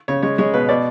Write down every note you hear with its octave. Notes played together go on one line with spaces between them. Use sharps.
C#3 C#5
G#3 C#5
G#3 C#5
B2 B4
B2 D5